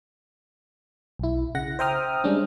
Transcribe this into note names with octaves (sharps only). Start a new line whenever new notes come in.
B1 E4
C#3 F#5 A#6
C5 E5 G5 A#5 D#6 F6
G3 G#3 C#4 D4